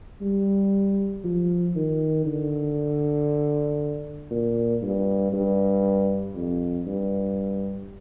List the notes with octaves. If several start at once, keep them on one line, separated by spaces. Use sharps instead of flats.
G3
F3
D#3
D3
A#2
G2
G2
F2
G2